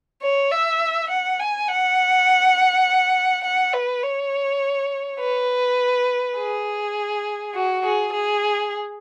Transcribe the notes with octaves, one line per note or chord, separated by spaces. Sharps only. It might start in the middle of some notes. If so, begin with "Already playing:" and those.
C#5
E5
F#5
G#5
F#5
F#5
B4
C#5
B4
G#4
F#4
G#4
G#4